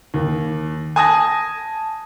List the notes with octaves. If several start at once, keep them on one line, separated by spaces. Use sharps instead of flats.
D#2
G#5 A5 D#6 G#6 A#6